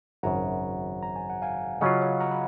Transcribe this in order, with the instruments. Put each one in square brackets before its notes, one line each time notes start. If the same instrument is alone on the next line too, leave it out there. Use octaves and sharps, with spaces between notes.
[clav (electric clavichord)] G#1 F#2 C#3 [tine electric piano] F#5 A#5
[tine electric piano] A#5
G#5
F#5
F5 G#5
[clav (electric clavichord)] C#3 F#3 C#4 F4 [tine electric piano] D#5 F#5
[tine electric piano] C#5 F5
F#5 A#5
B5